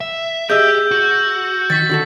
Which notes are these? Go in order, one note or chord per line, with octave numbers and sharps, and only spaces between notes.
E5
G4 G#4 D#5 E5 E6 G6
F#4
D#3 A6 B6
D3 F#4 A4